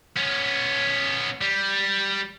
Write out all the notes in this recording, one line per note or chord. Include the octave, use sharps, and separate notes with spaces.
B3 C#4
G3